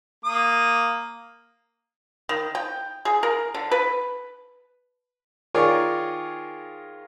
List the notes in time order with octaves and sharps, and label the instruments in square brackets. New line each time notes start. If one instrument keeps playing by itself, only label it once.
[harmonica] A#3 D#6
[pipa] D#3
G5
G#4
A#4
D3
B4
[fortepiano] D#3 F4 G#4 A#4 C#5 D5